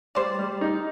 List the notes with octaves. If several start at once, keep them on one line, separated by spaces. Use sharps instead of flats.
G3 C5 D5
G3
D#4